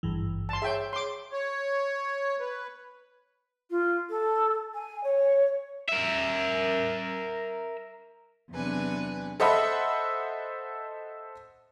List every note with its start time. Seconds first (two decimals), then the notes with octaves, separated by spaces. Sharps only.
0.03 G#1 G2 E3
0.49 A5 C6
0.62 G#4 C#5 E5 G5
0.93 C6 D6
1.32 C#5
2.40 B4
3.70 F4
4.09 A4
4.74 G#5
5.04 C#5
5.88 A#4 E5
8.51 E2 C3 F#3 D4 B4 G#5
9.40 A4 C5 D#5 E5 F#5 B5